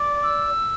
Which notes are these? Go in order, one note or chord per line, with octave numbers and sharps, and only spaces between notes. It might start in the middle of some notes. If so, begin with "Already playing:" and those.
Already playing: D5
E6